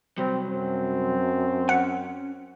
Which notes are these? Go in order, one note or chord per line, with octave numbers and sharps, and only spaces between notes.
C3 F#3 G3 C4
F#2 C4
C#4 F#5